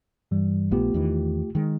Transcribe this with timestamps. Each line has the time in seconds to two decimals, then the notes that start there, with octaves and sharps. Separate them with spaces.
0.31 G2 E3 G3
0.71 A#1 A3 B3 F4 G4
0.94 E2 D#3 E3
1.55 D#3 G#3